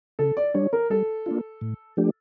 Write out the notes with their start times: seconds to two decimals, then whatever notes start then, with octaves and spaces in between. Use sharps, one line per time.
0.19 C#3 A4
0.37 D5
0.54 G3 D4 C#5
0.73 A#4
0.90 G3 A4
1.26 A#3 D4 F4
1.61 A2
1.97 F3 A3 D4 G4